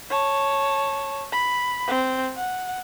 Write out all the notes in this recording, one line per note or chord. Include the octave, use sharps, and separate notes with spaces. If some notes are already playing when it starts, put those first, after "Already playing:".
C#5 A5
B5
C4
F#5